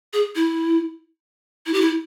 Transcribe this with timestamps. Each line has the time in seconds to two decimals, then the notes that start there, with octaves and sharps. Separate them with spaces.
0.13 G#4
0.35 E4
1.66 E4
1.74 G4
1.81 E4